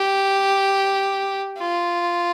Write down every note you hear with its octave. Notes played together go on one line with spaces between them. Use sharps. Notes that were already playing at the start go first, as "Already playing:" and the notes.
Already playing: G4
F4